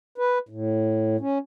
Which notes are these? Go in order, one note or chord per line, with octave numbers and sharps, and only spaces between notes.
B4
A2
C#4